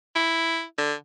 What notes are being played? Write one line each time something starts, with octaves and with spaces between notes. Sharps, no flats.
E4
D3